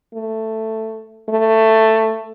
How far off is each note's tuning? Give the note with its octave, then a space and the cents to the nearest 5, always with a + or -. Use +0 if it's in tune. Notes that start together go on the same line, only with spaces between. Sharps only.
A3 +10
A3 +10